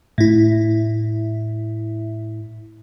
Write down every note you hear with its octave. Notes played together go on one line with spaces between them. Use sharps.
A2 E4